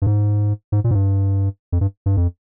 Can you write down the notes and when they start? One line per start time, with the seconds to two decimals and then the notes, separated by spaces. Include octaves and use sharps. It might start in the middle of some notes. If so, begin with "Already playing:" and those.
0.02 G2
0.07 G#2
0.72 G#2
0.84 A#2
0.91 G#2
0.94 G2
1.72 F2
1.81 G2
2.06 G2
2.17 F2